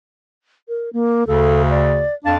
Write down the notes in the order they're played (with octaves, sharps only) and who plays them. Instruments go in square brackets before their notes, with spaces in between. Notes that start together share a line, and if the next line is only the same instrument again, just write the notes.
[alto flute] A#4
A#3
[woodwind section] D2 C#3 [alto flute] A4
[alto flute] D5
[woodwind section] F2 D4 A5 [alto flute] F5